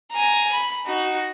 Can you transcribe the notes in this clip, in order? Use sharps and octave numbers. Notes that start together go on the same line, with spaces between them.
G#5 A#5
B5
D#4 F#4